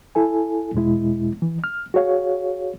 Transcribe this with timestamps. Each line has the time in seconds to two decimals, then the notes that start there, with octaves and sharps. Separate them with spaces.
0.15 E4 A4 G#5
0.74 E2 B2 G#3 E4
1.42 E3
1.64 F6
1.94 F#4 G#4 C#5 F5